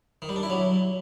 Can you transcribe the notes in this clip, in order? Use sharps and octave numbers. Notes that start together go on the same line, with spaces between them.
D#3
G3
D4
E4
F#3